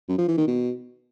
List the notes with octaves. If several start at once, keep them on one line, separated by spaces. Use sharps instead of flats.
F#2
F3
E3
D#3
B2